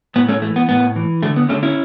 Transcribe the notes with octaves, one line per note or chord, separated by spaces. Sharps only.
A2 B3
A3 C#4
E3 A3
B3
A2 B3
E3
D3 A3
B3
D3 A3 C#4
C#4 E4